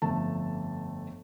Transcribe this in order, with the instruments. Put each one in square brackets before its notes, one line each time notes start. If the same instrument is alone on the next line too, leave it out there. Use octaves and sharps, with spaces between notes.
[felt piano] G1 F2 A3 A5